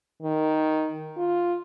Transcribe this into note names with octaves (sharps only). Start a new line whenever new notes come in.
D#3
F4